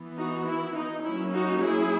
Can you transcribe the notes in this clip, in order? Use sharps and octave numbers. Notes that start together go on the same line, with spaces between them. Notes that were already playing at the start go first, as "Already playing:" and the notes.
Already playing: E3 B3
D#4 F#4
E4
D#4
F#3 A#3 C#4 E4
D#4 F#4
E4 G#4